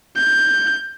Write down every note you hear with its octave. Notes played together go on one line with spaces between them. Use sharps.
G6